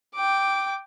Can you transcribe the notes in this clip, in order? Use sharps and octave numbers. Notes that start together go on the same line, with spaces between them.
G5 D6